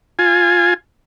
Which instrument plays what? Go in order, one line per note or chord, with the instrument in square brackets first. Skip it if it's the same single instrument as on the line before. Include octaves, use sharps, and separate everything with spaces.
[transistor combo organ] F4 G#5